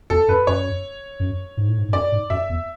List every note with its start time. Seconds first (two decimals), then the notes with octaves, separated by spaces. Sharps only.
0.10 E2 A4
0.28 F#2 B4
0.47 F#2 C#5
1.20 F#2
1.57 G#2
1.68 A2
1.78 G#2
1.88 G#2
1.93 F#2 D5
2.12 G#2
2.30 F#2 E5
2.49 E2